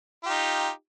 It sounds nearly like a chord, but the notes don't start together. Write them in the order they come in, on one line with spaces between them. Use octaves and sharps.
F4 G4 D#4